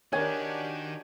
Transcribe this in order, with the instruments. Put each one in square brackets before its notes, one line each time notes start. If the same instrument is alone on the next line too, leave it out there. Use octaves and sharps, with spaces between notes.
[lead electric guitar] D#3 D#4 [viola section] D4 F#4 G4 [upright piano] A#4 C#5 [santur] G#5